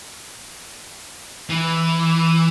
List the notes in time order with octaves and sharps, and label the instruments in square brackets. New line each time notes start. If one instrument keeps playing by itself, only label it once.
[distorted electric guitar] E3